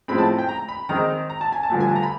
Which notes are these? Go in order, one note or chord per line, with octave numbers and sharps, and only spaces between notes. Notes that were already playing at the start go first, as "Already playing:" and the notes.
A2 F3 G#3 C4 B5
A5
G5
A#5
B5
D#3 G#3 C4 D#4 A#5
A#5
A5
G#5
A5
G2 D3 F3 A3
G#5
A5
A#5
B5